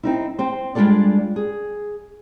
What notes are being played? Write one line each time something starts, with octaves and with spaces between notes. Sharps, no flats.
C4 D#4 E4
C4 C5
G3 G#3 D4 F4 A4 D5
G#4